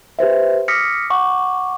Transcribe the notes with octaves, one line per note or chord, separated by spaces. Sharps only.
G4 B4 C5 E5
D6 D#6 F6 A#6 B6 C#7
F#5 C#6 D6